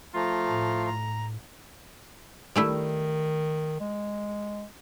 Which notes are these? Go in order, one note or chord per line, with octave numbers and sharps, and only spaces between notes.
F3 A3 F4 A#5
A2
A#5
D#3 G3 A3 E4
G#3